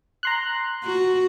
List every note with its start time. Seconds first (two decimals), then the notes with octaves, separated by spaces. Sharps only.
0.23 A#5 C6 F#6
0.84 F#4